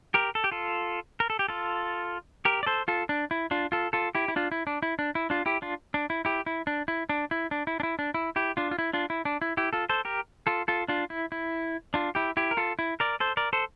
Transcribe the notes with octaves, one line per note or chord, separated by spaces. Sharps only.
G4 A#4
A4
G4
F4 A4
A#4
A4
G4
F4 A4
G4 A#4
D5
A4 C5
F4 A4
D4
E4
D4 F4
F4 A4
F4 A4
E4 G4
E4
D4 F4
E4
D4
E4
D4
E4
D4 F4
E4 G4
D4 F4
D4
E4
E4 G4
E4
D4
E4
D4
E4
D4
E4
D4
E4
D4
E4
E4 G4
D4 F4
F4
E4
D4 F4
E4
D4
E4
E4 G4
F4 A4
A4 C5
G4 A#4
F4 A4
F4 A4
D4 F4
E4
E4
D4 F4
E4 G4
E4 G4
A#4
F4 A4
E4
A#4 D5
A4 C5
A#4 D5
A4 C5